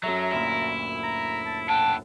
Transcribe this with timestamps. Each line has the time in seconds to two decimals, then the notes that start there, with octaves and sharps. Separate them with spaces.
0.03 F#2 F#3 A4 E5 A#5
0.32 D2 A#2 E4
1.03 A#5
1.46 A5
1.69 E4 F#5 G5 A5